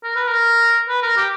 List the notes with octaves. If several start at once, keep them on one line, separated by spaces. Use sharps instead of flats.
A#4
B4
A#4
B4
A#4
G4